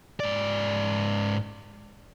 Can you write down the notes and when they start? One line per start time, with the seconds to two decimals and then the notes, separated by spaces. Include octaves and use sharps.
0.20 G#2 D5